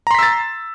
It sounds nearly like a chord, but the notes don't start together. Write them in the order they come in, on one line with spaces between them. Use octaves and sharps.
A#5 C6 B6 E6 A6